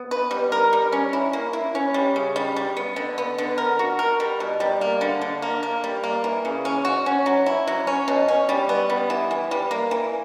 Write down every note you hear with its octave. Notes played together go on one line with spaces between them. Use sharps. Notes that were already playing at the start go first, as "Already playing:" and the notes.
Already playing: B3
B4
G3
A#4
G3
C#4
E4
A#3
E4
C#4
G3
C#3
G3
G3
B3
D3
B3
D3
A#4
F#4
A#4
G3
B2
G3
A#3
D3
D3
A#3
A#3
G3
A#3
E3
C#3
C#4
F#4
C#4
F#3
E4
F#3
C#4
B2
C#4
G3
B3
G3
E3
E3
G3
A#3
E3